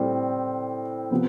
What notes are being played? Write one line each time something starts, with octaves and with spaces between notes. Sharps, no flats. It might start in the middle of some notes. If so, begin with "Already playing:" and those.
Already playing: A2 G3 C4
C3 F3 B3